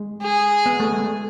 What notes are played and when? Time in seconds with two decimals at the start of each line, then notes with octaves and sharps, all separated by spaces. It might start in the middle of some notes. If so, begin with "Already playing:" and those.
Already playing: G#3
0.22 G#4
0.66 B3
0.80 A3
0.93 G#3
1.05 A3